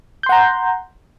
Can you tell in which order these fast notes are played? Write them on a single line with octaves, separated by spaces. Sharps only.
G6 C6 F#5 A#5